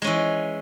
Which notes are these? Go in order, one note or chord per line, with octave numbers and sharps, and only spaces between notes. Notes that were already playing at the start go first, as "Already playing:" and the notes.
E3 G#3 C#4